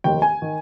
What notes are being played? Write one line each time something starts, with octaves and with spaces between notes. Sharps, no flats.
F1 D#2 D#3 G5
G#5
D#3